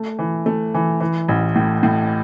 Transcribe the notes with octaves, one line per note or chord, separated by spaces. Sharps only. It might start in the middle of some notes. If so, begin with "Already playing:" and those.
Already playing: A3
E3
A3
E3
E3
A1
A2
A2